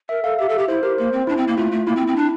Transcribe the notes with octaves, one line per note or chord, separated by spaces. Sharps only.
A#4 E5
A4 F5
G4 E5
A4
G4
E4 C5
G4 A#4
A#3 C5
C4
D4 E4
C4
A#3
A3 F4
A3
A#3 E4
C4
C4
D4